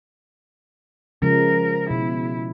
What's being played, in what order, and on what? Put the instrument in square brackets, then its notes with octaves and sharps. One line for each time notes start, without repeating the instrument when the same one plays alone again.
[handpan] C#3 F3 G#3 [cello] A#4
[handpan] B2 [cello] E4